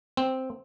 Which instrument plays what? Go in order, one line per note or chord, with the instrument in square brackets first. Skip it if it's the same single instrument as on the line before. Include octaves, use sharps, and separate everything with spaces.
[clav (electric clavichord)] C4